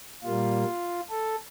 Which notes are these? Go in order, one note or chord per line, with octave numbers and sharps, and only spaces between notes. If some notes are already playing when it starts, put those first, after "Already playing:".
A#2 G3 A#3 F4
A4